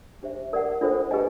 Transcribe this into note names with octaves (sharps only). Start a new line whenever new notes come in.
D4 G4 C5 E5
A#4 D5 F#5
D4 F4 A4 C5
G4 B4 D#5 G#5